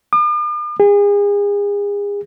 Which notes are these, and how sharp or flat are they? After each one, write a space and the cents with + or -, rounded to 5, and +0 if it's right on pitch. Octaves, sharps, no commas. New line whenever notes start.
D6 +45
G#4 -35